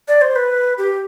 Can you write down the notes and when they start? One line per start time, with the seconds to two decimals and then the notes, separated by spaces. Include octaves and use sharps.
0.08 D5
0.22 C5
0.36 B4
0.78 G4